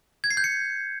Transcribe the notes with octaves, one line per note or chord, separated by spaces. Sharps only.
G#6
C7
G6
C#7